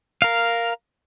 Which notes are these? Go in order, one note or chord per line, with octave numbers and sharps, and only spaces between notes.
A#4 F5